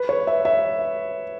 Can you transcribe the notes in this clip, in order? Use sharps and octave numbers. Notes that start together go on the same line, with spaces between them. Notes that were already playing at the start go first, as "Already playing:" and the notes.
Already playing: B4
C#5
E5
E5